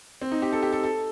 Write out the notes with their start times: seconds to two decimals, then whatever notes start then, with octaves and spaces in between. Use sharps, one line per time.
0.22 C4
0.32 D#4
0.42 G4
0.52 A4
0.62 G4
0.73 A4
0.84 A4